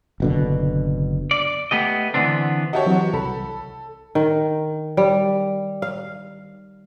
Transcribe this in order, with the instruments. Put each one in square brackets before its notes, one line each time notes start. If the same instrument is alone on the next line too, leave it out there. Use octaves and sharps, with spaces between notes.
[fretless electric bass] F#1 B2 D3
[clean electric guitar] D5
A3 B3 G4 D#5
D3 E3 B3 C4 D4
[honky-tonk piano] F#4 G4 C#5 [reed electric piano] D#5 E5 A5
[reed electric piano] E3 F#3 C4
[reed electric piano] C2 B5 [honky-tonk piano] A4
[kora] D#3
G3
F5